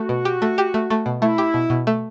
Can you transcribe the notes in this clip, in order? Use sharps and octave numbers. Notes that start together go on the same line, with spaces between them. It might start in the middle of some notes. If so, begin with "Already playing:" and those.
Already playing: A3 F#4
B2
G4
A3
G4
A3
A3
B2
A3 E4
G4
B2
B2
A3